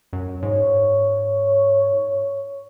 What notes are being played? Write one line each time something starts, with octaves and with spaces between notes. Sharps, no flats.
F#2
G#2 C#5